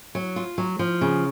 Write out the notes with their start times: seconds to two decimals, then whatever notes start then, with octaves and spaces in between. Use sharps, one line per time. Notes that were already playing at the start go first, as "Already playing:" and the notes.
0.15 F#3
0.36 F4
0.58 F#3
0.79 F3
1.01 C#3